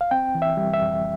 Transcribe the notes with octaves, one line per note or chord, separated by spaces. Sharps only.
F5
C4 G5
E3
E5
G3
E5
F2